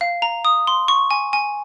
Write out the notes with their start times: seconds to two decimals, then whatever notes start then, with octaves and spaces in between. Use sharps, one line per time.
0.01 F5
0.22 A#5
0.45 D#6
0.67 C6
0.88 C#6
1.11 G#5
1.33 G#5